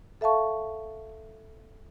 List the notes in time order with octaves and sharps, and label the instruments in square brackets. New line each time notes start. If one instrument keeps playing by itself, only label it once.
[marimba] A4 E5 F5 A5 C#6